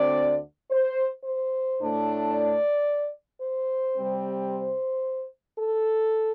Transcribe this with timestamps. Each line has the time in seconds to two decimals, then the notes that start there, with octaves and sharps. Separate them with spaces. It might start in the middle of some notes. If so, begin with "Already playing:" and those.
Already playing: D2 D3 C4 D5
0.70 C5
1.25 C5
1.79 A2 A3 D4
2.33 D5
3.42 C5
3.96 C3 G3 C4
4.51 C5
5.59 A4